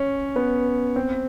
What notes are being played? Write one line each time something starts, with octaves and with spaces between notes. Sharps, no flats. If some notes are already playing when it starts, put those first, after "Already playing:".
Already playing: C#4
B3
C4